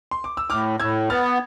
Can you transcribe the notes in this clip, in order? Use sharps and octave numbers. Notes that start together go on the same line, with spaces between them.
C6
D6
E6
A2 D6 F6
A2 E6 G#6
B3 F6 A6